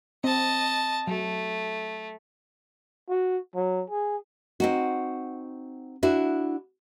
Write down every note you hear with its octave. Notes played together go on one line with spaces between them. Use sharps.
C4 D#5 A5
F#3 A3
F#4
F#3
G#4
C4 D#4 F#4
D4 E4 F#4